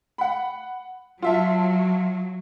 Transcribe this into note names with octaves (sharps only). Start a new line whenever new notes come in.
F#5 B5
F#3 F4 E5 A5